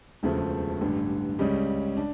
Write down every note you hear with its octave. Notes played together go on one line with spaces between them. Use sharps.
E1 D2 C#3 F3 A3
A1 G2 D3
C#2 C#3 G3 C#4
D4